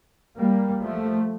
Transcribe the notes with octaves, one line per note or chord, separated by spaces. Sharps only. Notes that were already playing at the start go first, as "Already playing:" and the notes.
G3 A#3
F3 A3